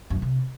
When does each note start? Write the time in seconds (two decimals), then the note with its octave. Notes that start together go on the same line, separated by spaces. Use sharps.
0.10 F#2
0.16 A#2
0.22 C3